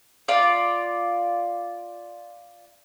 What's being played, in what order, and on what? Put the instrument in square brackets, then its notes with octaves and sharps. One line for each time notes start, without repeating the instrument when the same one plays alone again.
[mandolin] F4 D5